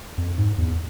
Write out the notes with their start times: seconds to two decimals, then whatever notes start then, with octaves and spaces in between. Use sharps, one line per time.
0.18 F2
0.38 G#2
0.58 E2